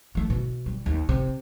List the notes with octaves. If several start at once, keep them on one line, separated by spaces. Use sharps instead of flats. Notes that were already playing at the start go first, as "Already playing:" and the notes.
E3 A3
B2
G3
D#2
C3